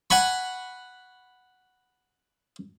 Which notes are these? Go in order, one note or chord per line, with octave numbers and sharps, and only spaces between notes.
F#5 G#5 B5 C#6